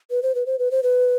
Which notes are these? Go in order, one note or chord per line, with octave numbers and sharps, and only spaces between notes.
B4
C5
B4
C5
B4
C5
B4